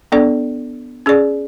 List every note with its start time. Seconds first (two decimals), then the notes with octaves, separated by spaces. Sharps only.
0.12 B3 D4 A4 D5
1.06 C#4 G#4 D5